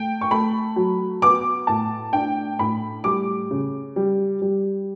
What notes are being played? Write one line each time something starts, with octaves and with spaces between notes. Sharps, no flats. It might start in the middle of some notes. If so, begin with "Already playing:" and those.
Already playing: A3 G5
C#6
A3 B5
F#3
B3 D6
A2 A5
D4 G5
A2 B5
G3 D6
C#3
G3
G3